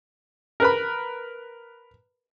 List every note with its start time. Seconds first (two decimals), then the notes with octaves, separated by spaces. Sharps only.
0.60 A#4 B4 B5